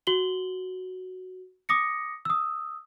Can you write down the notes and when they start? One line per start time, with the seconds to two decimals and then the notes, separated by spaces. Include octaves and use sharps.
0.07 F#4 F#7 G7
1.69 D6 D#6 A#6 C#7
2.25 D#6 E6